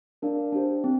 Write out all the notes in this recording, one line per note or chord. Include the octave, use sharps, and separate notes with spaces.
D4 A#4 D5 F5
D4 G4 C5
C4